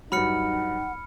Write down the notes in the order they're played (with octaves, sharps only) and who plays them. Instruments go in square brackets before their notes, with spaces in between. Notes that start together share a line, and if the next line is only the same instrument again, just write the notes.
[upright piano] G2 F#3 [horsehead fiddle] D#4 [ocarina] F#5 [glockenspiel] B5 F6 C#7